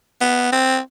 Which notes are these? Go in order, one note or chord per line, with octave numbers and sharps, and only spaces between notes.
B3
C4